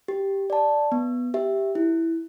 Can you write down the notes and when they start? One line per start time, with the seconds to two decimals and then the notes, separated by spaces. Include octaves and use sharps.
0.08 G4
0.50 D5 A5
0.92 B3
1.34 G4 E5
1.75 E4